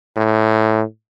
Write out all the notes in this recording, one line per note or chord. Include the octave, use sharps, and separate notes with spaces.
A2